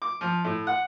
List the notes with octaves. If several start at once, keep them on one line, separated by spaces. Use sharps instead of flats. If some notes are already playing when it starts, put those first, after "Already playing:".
D6
F3
A2
F#5